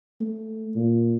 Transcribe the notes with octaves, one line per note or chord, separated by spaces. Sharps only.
A3
A#2